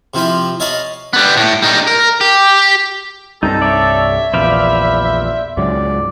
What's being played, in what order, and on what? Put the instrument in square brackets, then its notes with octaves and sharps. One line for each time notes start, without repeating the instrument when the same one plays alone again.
[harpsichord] C3 F3 E4 F4 B5
C#5 D#5 F5 A5 B5
[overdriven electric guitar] G3 B3
A2
G3 D#4
A#4
G4
[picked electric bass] C2 G2 C3 [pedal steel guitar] D#4 [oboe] A4 [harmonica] A#5
[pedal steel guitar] C#5 D5 [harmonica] E5
[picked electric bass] A#1 E2 [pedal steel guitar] C5 D5 F5 [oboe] B5
[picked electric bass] C#2 G#2 F#3 [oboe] D5